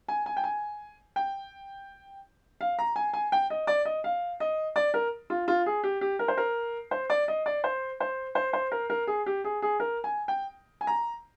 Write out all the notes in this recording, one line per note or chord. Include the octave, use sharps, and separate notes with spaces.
G#5
G#5
G5
G#5
G5
F5
A#5
G#5
G#5
G5
D#5
D5
D#5
F5
D#5
D5
A#4
F4
F4
G#4
G4
G4
A#4
C5
A#4
C5
D5
D#5
D5
C5
C5
C5
C5
A#4
A#4
G#4
G4
G#4
G#4
A#4
G#5
G5
G#5
A#5